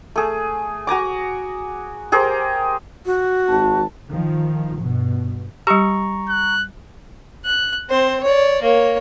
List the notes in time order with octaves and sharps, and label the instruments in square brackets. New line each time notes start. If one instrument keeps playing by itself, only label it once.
[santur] A3 G#4
F#4 G#5 A#5 D6
G4 G#4 A#4 C5
[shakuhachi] F#4
[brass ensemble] G#1 A5
[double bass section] D#3 F3
G2 B2
[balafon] G3 G4 [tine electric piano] A#5 C#6
[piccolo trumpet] F#6
[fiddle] F#6
C4 C5
C#5 D5
A#3 C#5